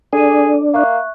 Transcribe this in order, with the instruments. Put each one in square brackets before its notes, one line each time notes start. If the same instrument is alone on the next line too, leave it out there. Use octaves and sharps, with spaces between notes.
[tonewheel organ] D4 [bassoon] G#4 [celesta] A4 D#7
[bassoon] A#3 [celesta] E5 C#6 F#6